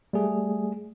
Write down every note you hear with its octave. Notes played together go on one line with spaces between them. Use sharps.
G3 A3 G#4